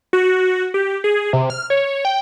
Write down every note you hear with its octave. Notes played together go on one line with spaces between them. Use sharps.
F#4
G4
G#4
C3
F6
C#5
G5